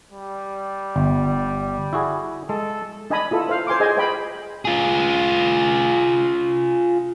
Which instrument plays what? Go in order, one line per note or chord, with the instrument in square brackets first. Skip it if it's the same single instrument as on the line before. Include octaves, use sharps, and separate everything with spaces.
[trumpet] G3
[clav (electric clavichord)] G1
E4 F#4 G#4
[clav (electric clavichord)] G#3 [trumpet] A4
[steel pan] D4 D#5 G#5 A5 B5 D#6
E4 F4 A4
C5 F5
C5 G#5 C6 D6
G#4 C5 D#5 G#5
C5 D#5 G5 G#5 B5
[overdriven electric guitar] F4 G#4